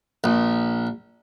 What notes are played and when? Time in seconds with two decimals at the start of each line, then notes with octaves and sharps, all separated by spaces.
0.24 A#1